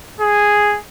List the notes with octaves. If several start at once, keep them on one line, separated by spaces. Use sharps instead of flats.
G#4